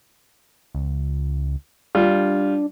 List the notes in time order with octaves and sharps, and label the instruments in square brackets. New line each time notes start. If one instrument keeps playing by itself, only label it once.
[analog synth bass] C#2
[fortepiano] G3 F4 [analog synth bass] D4